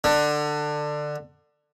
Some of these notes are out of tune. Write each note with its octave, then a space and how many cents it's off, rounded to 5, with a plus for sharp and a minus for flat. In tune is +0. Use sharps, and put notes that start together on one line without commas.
D3 +20